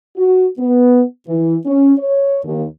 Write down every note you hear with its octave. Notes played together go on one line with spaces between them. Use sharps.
F#4
B3
E3
C#4
C#5
D#2